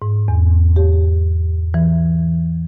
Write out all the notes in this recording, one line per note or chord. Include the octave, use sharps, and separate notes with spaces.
G#2
E2
G4
E3